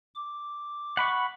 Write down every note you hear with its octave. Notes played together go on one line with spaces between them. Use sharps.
D6
F#5 B5 C#6